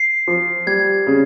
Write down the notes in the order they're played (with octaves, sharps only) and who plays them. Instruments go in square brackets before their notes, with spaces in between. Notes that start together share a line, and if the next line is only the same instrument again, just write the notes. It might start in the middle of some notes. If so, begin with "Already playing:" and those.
Already playing: [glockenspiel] C7
[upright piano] F3
[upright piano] G3 [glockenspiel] G#6
[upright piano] C#3